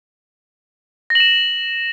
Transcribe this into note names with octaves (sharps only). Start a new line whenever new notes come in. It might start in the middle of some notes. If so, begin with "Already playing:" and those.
A#6
F#7
E7